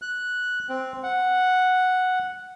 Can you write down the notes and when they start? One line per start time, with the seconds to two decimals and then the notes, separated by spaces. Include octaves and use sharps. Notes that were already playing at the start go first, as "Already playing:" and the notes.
0.02 F#6
0.69 C4
1.03 F#5